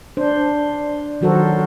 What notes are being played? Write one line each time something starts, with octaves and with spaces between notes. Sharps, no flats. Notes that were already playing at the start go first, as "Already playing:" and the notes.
D4 C5
D#3 F#3 F#4 A4 A#4 C5